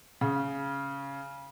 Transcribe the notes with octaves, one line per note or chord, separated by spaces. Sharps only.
C#3